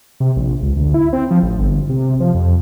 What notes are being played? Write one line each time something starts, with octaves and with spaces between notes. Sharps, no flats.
C3
A#1
C#2
D2
E4
C4
F3
A1
G1
C3
F3
F2